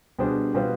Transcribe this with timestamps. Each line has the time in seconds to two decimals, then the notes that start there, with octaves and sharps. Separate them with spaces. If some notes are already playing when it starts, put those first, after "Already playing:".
0.19 B2 G3 D4 G#4 C5
0.54 B2 G3 B3 F4 C5